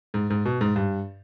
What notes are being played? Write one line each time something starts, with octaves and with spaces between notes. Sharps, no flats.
G#2
G#2
B2
G#2
G2